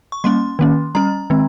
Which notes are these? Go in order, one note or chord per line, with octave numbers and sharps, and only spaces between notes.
C#6
G3 A#3 C#4 C6
D#3 A#3 C#4
G3 C#4 A#5
D#3 G#3 C4